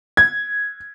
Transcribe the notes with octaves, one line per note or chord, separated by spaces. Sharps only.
G#6